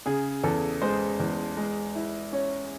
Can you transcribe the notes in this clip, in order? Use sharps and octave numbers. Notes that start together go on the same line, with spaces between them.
C#3 G#4
E2 A4
G#3 C5
E2
G#3
E4
C#4 C#5